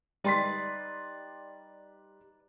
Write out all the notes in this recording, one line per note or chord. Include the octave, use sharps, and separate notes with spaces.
G3 D#4 B4 D5 C6 B6